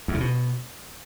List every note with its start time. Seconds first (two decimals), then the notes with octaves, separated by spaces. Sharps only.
0.08 E2
0.14 C#3
0.20 B2